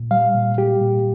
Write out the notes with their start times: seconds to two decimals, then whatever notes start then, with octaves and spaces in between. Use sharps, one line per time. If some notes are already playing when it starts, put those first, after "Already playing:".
Already playing: A#2
0.11 G3 F5
0.35 A#2
0.58 G3 G4
0.81 A#2